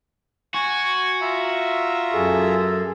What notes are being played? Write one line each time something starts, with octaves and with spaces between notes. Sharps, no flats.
F#4 G#5
F4 E5 A#5
F#2 G#4 A4